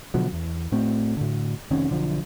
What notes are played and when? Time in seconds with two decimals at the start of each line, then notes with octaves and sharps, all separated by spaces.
0.14 B2 D3 F3 F#3
0.33 E2
0.72 A2 A3 C4
1.17 A2 D3
1.71 F1 D#3 C4 C#4
1.90 B1 D3 F3